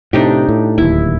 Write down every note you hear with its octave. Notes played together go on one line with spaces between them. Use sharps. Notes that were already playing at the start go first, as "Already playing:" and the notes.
A2 C3 D4 D#4 G4
A2
D1 D#2 E4